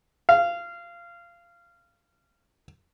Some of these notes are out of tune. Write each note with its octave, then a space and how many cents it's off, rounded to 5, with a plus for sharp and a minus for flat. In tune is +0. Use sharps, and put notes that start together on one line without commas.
F5 -20